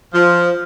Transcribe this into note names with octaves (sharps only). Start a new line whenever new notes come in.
F3